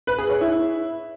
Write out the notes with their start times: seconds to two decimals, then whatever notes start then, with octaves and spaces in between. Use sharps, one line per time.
0.07 B4
0.18 G#4
0.30 C#5
0.41 E4